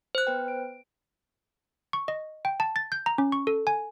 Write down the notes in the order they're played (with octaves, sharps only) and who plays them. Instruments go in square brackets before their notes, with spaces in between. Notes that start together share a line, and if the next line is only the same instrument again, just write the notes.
[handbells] C5 F#6
[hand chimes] B3 B4 G5
D7
[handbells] C#6
D#5
G5
A5
A6
G6
A#5
C#4
C#6
A4
G#5